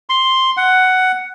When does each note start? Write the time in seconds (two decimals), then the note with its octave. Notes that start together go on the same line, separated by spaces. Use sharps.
0.09 C6
0.57 F#5